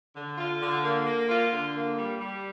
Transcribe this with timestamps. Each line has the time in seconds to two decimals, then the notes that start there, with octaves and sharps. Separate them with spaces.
0.15 D3
0.38 F4
0.62 D3
0.84 A#3
1.06 A#3
1.29 F4
1.52 D3
1.75 A#3
1.97 G3
2.19 G3